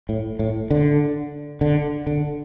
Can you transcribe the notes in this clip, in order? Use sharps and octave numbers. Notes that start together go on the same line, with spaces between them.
A2
A2
D3
D3
D3